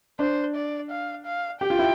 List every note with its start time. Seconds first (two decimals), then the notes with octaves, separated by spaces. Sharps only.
0.19 D4 C5
0.55 D5
0.90 F5
1.26 F5
1.61 G4 G5
1.70 F4
1.79 E4